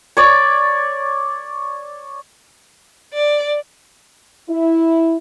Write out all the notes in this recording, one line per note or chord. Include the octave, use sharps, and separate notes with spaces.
C#5 D5
D5
E4